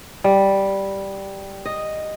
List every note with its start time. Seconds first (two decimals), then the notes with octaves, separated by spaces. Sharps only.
0.24 G3
1.66 D#5